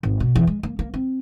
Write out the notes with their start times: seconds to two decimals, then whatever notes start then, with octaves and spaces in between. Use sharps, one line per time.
0.03 G#1
0.20 B2
0.35 E2
0.47 G#3
0.63 A#3
0.79 A#3
0.94 C4